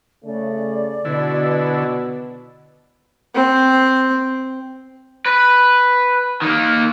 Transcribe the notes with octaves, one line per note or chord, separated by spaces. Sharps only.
C#3 A3 D5
B2 D3 E4
C4
B4
D#3 A#3